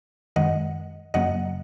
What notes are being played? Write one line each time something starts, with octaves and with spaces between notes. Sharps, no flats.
F#2 D#3 G#3 D#5 F#5
F#2 C#3 F#3 A#3 D#5 F#5